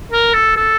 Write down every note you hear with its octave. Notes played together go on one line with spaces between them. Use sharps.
A#4
A4
A4